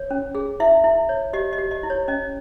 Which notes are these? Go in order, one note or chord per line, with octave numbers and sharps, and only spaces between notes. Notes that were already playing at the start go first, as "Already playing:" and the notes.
Already playing: C#5
C#4
G#4
E4 E5
E4
C#5
G4 D#5
D#5
G4
D#5
E4
C#5
C#4 D#5